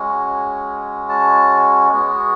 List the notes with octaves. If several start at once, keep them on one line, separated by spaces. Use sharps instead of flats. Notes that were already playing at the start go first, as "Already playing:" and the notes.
Already playing: G#3 C#4 F#4
A5
G#3 B3 F#4